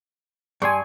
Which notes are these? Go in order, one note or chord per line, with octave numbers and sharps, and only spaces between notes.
G2 G#5 C6 C#6